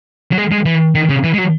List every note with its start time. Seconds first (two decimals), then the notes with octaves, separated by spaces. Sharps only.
0.32 F#3
0.38 G#3
0.52 G#3
0.65 E3
0.95 D#3
1.09 C#3
1.24 E3
1.34 G#3
1.38 F#3